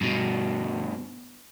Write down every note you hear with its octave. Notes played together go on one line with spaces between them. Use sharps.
G2 B2